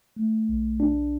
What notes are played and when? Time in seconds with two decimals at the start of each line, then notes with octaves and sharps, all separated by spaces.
0.16 A3
0.49 B1
0.80 D4